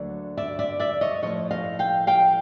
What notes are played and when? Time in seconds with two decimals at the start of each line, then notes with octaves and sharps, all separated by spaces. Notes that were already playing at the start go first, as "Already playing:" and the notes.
Already playing: D2 D3 F#3 A#3 D5
0.37 D5 E5
0.59 D5 E5
0.79 D5 E5
1.01 C#5 D#5
1.22 A2 F3 A3 C#5 D#5
1.51 D#5 F5
1.79 F5 G5
2.07 F5 G5